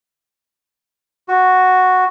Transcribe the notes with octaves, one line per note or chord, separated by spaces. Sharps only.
F#4